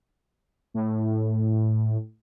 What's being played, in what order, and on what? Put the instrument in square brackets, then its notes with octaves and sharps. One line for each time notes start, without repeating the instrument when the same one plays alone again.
[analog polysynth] A2